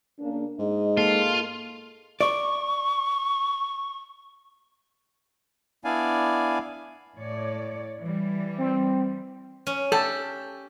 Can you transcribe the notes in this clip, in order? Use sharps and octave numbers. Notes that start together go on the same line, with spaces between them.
C#3 A#3 D4
G#2 G#4 D#5
A#3 F4 A4
D5 C#6
B3 D4 E4 D5 F5 G#5
A2 C#5 D5
E3 G3
C4
C#4
G4 A4